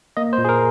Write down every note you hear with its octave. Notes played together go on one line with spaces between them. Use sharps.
A#3 D#5
C5
A#2
G#4
A#4